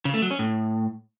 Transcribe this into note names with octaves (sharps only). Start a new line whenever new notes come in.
C#3
A3
F#3
C#4
A2